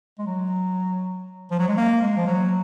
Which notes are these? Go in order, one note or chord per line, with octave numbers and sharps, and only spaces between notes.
G#3
F#3
F3
F#3
G#3
A#3
G#3
F3
F#3